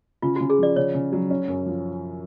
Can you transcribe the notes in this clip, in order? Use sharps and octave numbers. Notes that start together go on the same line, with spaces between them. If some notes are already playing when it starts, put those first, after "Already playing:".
C#3 F4
C#3 F#4
G#4
F3 D5
C#3 C#5
C#3
F#3
C#4
F#2
F3